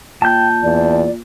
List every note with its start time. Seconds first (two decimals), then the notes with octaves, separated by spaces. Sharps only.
0.22 A#2 G5 A5 G6
0.63 E2 D5